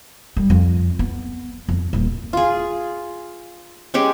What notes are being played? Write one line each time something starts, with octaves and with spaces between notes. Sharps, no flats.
D#2 G3
F2
B3
F2
D#1 A#3
F4 G#4
G#3 C#4 G4 G#4